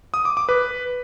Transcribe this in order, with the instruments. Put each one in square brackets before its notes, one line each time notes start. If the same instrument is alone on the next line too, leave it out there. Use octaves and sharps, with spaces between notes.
[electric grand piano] D#6
D6
D6
B4